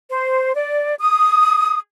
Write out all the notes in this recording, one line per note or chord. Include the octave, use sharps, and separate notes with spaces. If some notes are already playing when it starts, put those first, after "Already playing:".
C5
D5
D#6